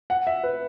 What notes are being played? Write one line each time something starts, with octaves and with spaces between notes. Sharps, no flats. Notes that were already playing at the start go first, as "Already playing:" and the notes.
F#5
E5
B4